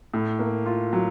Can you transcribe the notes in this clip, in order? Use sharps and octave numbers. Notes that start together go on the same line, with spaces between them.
A2
A#3
F4
F#3